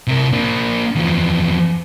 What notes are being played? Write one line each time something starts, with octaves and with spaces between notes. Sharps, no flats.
C3 A#4
A#3 D4
E2 F3